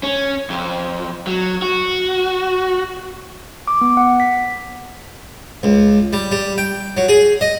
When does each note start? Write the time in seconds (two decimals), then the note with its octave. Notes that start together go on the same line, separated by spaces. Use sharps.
0.03 C#4
0.50 F2
1.27 F#3
1.62 F#4
3.67 D6
3.81 B3
3.97 F#5
4.20 B6
5.63 C#2
6.13 G3
6.32 G3
6.58 G5
6.97 F#3
7.08 G#4
7.41 D#5